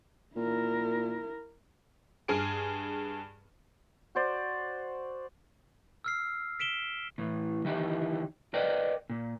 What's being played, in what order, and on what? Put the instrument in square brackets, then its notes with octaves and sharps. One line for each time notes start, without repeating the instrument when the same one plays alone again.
[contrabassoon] A#2 [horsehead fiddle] E4 A#4
[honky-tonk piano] G2 G#4 G#5 F6 D7
[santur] F#4 C5 D5
[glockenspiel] E6 F6 C7
B6 D7 E7 G7
[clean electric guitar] A2 E3
D#3 E3 D#4 E4 G4
A#4 B4 D5 D#5 G5
A#2